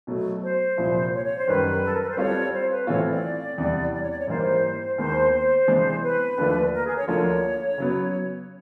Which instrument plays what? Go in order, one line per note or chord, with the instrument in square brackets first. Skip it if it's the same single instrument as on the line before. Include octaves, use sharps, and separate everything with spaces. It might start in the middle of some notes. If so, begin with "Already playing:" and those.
[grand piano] B2 F#3 A3
[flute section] C5
[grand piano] C2 A#2 F3
[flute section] C#5
C#5
C5
[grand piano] F#2 D#3 G3 [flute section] B4
[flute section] A4
A#4
B4
C5
[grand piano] G3 C4 F4 A4 [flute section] C#5
[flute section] C5
B4
[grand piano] A2 E3 A3 C4 F4 [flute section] C#5
[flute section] D5
[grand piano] E2 C3 E3 G3
[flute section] D5
C#5
D5
C#5
[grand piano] G#2 E3 G3 A#3 [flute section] C5
[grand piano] D#2 D#3 G#3 B3 D#4 [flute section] C5
[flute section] C5
[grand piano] C3 E3 G#3 B3 D4
[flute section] B4
[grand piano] D#2 D3 F3 A3 D4
[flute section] A#4
G#4
C#5
[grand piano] D2 D3 F3 A#3 [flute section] C#5
[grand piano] C#3 F#3 B3